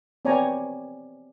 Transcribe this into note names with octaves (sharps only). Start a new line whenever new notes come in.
B3 C4 C#5 D5 G#5 A#5